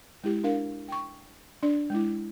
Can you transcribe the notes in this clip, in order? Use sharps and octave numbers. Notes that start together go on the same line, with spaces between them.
G#3 E4 G4
D4 A#4 F5
G5 C#6
D4 D5
G#3 E4